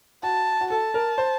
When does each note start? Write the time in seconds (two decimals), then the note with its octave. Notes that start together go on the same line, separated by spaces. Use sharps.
0.23 F#4 A5
0.61 F#4
0.70 A4 A5
0.94 A#4
1.18 C5